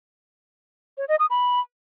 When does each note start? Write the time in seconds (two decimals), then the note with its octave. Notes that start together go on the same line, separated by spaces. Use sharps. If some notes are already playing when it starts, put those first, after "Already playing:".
0.98 C#5
1.09 D#5
1.19 D#6
1.30 B5